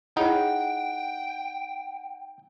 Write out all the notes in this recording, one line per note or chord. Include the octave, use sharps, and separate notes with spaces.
D#4 E4 G#4 C#5 F#5 G5